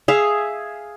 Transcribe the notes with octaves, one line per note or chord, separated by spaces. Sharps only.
G#4 E5 F5